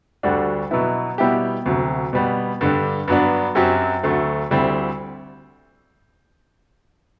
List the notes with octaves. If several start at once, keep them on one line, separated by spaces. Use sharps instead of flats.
D2 D3 G3 D4 F#4
B2 F#3 B3 E4
B2 G3 B3 E4 G4
D2 C3 F#3
B2 G3 B3
G2 D3 G3
G2 F#3 B3 D4
F#2 F#3 C4 G4
D2 D3 F#3 A3
D2 D3 G3 C4 E4